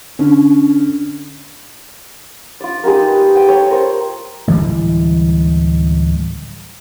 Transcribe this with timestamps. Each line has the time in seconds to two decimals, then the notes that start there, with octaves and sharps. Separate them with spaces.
0.19 D3 C#4
2.60 F4 D5
2.84 G#3 D#4 G4 A#4
3.07 B4
3.35 G5 G#5
3.48 A4 C#5
3.71 A#4 C5
4.48 D1 E3 G3 G#3